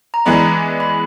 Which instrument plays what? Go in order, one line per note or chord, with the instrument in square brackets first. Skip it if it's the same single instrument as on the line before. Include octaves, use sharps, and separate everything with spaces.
[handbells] A#5
[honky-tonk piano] E3 G#3 B3 D4 [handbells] B5
[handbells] B5